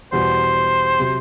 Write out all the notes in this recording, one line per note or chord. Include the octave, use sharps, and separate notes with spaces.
E2 B2 G3 C5
C3 F#3